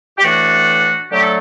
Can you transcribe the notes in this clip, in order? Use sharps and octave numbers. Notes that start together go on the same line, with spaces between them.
G4
A2 E3 A3 D4 F#4
D3 F#3 A3 G4
A4